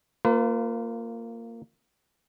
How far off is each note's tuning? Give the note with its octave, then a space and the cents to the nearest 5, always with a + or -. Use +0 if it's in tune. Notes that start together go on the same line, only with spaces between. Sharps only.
A#3 -15 F4 +0 B4 +40